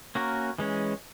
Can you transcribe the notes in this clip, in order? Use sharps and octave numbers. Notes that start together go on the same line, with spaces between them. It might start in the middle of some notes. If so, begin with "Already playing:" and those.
A#3 C#4 F#4 A#4
E3 G#3 C#4